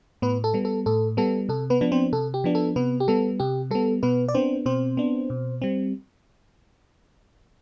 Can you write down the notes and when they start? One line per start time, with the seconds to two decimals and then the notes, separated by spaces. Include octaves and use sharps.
0.22 A2 B3 B4
0.44 A4
0.54 G3 B3
0.65 A4
0.86 A2 A4
1.17 G3 B3 A4
1.49 C3 A4
1.70 B3 B4
1.81 F3 B3 D4
1.92 C4 C5
2.13 C3 A4
2.34 G4
2.44 F3 B3 D4
2.55 A4
2.76 C3 B3 B4
3.00 G4
3.08 G3 B3 A4
3.40 C3 G4
3.71 G3 B3 A4
4.03 B2 B3 B4
4.28 D5
4.35 B3 C4 D4 C5
4.66 B2 C4 C5
4.97 B3 D4
5.30 B2
5.62 G3 C4